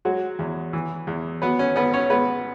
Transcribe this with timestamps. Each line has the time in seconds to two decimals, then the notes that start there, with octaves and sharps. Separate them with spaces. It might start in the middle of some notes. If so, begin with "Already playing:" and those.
0.05 F#3 G#3 F#4
0.39 E2
0.73 E3
1.07 E2
1.42 F#3 B3 B4
1.59 C#4
1.76 G#1 B3 B4
1.94 C#4 C#5
2.10 G#3 B3 B4